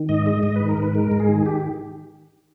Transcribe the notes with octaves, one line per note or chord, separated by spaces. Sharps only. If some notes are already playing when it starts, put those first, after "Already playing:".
Already playing: D#3
G#2 D#5
G#3 D#5
G#2 D#5
D#3 B4
A#4
G#2 B4
G#3 A#4
G#2
G#4
D#3
G4